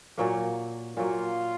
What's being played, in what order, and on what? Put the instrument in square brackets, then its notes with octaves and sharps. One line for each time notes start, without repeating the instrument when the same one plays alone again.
[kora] A#2 F#3 A#3
[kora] A#2 F#3 A#3 [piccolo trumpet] F4